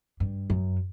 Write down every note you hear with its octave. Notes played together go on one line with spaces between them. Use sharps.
G2
F#2